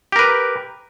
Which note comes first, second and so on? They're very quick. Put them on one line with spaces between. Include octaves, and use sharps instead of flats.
G4 A#4 B4